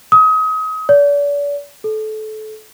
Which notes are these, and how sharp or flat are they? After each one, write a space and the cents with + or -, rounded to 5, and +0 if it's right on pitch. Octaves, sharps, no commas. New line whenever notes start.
D#6 +30
D5 -40
A4 -25